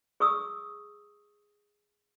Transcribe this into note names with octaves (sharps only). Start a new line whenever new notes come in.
G#4 C#6 D#6 E6